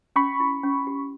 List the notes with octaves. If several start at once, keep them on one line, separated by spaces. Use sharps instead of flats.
C#4 B5 C#6
E4
C#4
G4